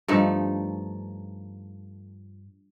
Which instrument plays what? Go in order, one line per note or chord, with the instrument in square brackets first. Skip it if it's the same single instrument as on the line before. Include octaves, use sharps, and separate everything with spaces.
[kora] G2 F3 A3 D#4